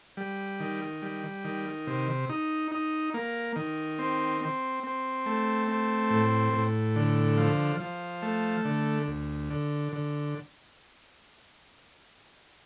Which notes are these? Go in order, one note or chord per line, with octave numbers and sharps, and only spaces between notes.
G3
D#3
G3
D#3
C3
D#4
D#4
A#3
D#3
C4
C4
C4
A3
C4
A2
A2
D3
F3
F3
A3
D3
D2
D3
D3